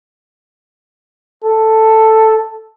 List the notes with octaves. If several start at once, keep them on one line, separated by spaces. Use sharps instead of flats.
A4